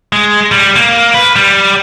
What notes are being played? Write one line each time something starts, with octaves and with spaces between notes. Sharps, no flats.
G#3
G3
A#3
B4
G3